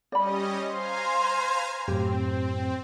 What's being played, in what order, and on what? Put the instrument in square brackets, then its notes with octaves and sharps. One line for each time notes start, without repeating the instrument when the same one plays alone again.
[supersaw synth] G3 C#4 D#5 [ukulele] D5 B5
[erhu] C5 [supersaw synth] F5 G#5 A#5
[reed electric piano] F#2 A2 [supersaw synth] C4 [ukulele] G4